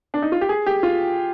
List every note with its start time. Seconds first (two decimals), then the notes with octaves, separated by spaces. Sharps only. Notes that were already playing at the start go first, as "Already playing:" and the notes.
0.14 D4
0.22 D#4
0.32 F4
0.41 G4
0.49 G#4
0.66 G4
0.83 F4